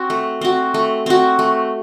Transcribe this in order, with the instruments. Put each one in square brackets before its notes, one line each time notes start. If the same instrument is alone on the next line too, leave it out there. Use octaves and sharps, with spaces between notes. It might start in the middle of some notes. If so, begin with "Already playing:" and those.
Already playing: [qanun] C4 F#4
A3
C4 F#4
A3
C4 F#4
A3